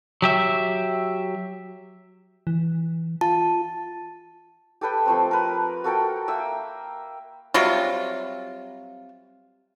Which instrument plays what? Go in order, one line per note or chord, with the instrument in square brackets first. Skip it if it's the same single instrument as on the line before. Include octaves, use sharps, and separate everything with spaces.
[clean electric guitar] F#3 G4 E5
[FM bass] E3
[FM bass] F4 [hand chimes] A5
[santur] G4 A4 B4 G5
F3 A3 C4
A#4 B4
F#4 A4 A#4 G5
A#3 E5 G5 E6
[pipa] C3 F#3 G3 F4